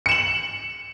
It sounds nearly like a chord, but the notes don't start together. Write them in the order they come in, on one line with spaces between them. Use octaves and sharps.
C#7 E7 F#7